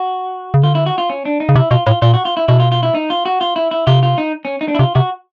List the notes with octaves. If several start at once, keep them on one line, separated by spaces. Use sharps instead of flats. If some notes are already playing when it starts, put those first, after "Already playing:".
Already playing: F#4
C#3
D3 F4
E4
F#4
F4
C#4
D4
D#4
C#3
C3 E4
B2 F4
A2 F4
A#2 F4
F#4
F4
E4
B2 E4
F4
F4
E4
D#4
F4
F#4
F4
E4
E4
C3 F4
F4
D#4
C#4
D#4
D4
E4
C3 F4
C3 F#4